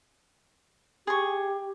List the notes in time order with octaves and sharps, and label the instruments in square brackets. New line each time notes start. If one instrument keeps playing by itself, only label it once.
[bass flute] G4 [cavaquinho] G#4 C#6